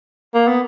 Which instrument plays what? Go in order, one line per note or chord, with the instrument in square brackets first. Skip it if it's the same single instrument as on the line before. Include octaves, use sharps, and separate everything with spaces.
[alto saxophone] A#3
B3